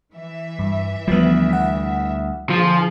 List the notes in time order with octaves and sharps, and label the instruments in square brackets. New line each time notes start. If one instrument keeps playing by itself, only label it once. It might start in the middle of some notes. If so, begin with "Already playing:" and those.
[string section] E3 E5
[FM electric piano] G2
[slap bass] D2 G3 [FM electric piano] F3 B3
[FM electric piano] F#5
[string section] A#2 D3 G#4 [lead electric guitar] F3